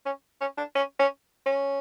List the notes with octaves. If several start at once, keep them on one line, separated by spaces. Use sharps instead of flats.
C#4
C#4
D4
C#4
C#4
C#4